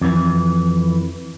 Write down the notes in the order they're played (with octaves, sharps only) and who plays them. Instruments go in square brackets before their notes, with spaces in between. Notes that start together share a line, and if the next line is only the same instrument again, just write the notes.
[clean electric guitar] F2 E3